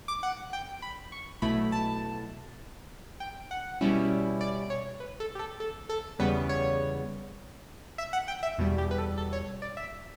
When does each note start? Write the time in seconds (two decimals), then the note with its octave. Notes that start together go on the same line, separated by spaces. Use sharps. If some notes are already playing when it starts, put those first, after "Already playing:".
0.08 D6
0.23 F#5
0.53 G5
0.82 B5
1.12 C#6
1.42 B1 B2 A3 E4 B5
1.72 A5
3.20 G5
3.51 F#5
3.81 B2 G3 C#4 E4
4.41 D5
4.70 C#5
5.00 B4
5.20 A4
5.35 G4
5.39 A4
5.60 A4
5.89 A4
6.19 E2 C#3 G3 B3 B4
6.49 C#5
7.98 E5
8.13 F#5
8.28 G5
8.43 E5
8.58 E2 B2 G3
8.78 G4
8.91 B4
8.98 A4
9.18 A4
9.33 C#5
9.62 D5
9.77 E5